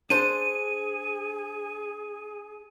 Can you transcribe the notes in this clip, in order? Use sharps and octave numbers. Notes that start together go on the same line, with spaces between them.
D4 G#4 C5 D#7